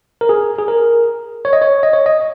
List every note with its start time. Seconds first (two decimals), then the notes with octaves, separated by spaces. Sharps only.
0.21 A#4
0.29 G#4
0.58 G#4
0.68 A#4
1.45 C#5
1.53 D#5
1.62 C#5
1.83 D#5
1.93 C#5
2.06 D#5